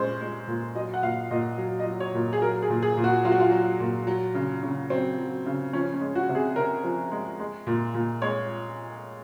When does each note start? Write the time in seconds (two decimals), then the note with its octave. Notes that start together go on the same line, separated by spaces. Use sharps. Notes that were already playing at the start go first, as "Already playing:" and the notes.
Already playing: A#2 G#3 C#4 C5
0.21 G#3
0.48 A#2
0.75 F#3 D#5
0.94 F#5
1.03 A#2 F5
1.31 A#2 D#5
1.58 F#3
1.80 D#5
1.86 F#3
2.00 C#5
2.14 A#2
2.33 G#4
2.41 F#3 A#4
2.62 G#4
2.70 A#2
2.83 G#4
2.97 A#2
3.04 F#4
3.24 F#3 F4
3.32 F#4
3.40 F4
3.52 F#3
3.80 A#2
4.07 F#3
4.34 C#3
4.63 C#3
4.90 F#3 C4
5.18 F#3
5.46 C#3
5.73 F3 C#4
5.94 C#4
6.01 G#3
6.15 F#4
6.29 C3
6.35 G#4
6.56 C3 A#4
6.83 F3
7.12 G#3
7.40 G#3
7.67 A#2
7.94 A#2
8.22 G#3 C#5